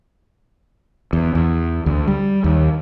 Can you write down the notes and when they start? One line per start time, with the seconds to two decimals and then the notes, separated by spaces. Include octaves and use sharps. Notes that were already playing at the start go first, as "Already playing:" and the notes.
1.13 E2
1.35 E2
1.86 D2
2.08 G3
2.44 D#2